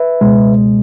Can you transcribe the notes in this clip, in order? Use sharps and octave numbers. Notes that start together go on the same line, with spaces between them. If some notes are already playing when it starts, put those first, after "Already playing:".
Already playing: B4 E5
C#2 B2 G#3